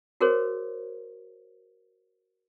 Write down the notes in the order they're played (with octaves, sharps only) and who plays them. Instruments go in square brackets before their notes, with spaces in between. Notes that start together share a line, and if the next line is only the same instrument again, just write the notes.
[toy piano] F#4 G#4 A#4 C5 C#5